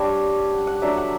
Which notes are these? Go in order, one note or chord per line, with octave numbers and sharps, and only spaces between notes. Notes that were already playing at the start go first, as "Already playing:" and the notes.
Already playing: G3 D4 C#5
F#5
F#5
F#3 A3 D4 E5
F#5